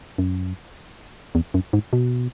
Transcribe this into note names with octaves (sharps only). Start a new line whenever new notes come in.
F#2
E2
F#2
G#2
B2